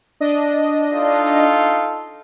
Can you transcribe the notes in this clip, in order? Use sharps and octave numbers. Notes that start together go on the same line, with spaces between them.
D4 D#5
D#4 F4 A4